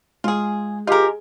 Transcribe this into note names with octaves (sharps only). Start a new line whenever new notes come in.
G#3 F4 G#4
F4 G4 G#4 A#4 D#5